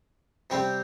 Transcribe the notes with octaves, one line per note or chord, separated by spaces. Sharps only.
C3 G3 C4 G4